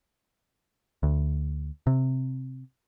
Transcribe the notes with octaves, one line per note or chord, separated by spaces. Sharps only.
D2
C3